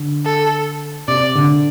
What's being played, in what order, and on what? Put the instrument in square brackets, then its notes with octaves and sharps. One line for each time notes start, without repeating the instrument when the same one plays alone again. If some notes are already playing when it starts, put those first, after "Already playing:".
Already playing: [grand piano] D3
[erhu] A4
[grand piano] C3 [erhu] D5
[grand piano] D3